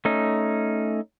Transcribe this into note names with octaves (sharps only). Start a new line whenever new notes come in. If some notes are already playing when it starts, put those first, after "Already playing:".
A3 C#4 D#4